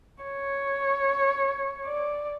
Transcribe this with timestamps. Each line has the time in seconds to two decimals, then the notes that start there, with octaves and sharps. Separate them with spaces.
0.24 C#5
1.86 D5